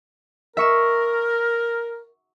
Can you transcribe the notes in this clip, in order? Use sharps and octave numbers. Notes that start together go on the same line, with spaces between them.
A#4 E5 C#6 E7